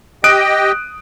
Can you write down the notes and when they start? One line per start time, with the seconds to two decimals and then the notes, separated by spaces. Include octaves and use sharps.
0.24 G4 D#5 G5 D#6 F#6 D7